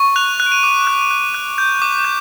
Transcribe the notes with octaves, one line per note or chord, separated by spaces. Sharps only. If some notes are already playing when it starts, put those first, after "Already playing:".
Already playing: C#6
F#6 F7
F#6
D7
D#7
D6
F#6
F#6
F#6
G6
D6
G6